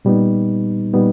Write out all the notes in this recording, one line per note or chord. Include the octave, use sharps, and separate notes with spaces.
A#2 G3 B3 D#4
A#2 G3 B3 D#4